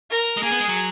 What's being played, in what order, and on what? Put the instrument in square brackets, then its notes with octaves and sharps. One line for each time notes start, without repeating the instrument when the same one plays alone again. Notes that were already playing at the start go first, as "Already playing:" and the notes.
[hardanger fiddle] A#4
[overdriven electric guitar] G#3
[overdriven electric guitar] A#3 [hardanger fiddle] G#4
[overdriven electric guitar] B3
G#3
F#3